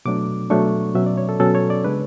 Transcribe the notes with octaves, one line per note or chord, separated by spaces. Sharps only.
B2 F#3 A3 D4 D6
B2 F#3 A3 D4 C#6
B2 F#3 C#4 E5
D5
C#5
A4
B2 F#3 C#4 A4
C#5
D5
C#3 G#3 B3 D4 B4